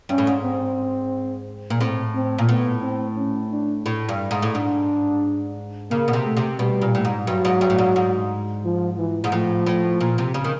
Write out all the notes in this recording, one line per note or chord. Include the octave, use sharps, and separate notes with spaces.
G2 C#4
A2
G#2
C4
A#2
A2 C4
C4
A#2
A2 B3
C4
C#4
D4
A2
G2
G#2
A2
G#2 D4
C#3 A#3
B2
C3
A3
C3
B2 G3
A#2
A2
G#2
G2 F#3
G#2
G2
A2
G#2
G#2
F3
E3
G#2
A2 F3
A2
A#2
C3
C#3
D#3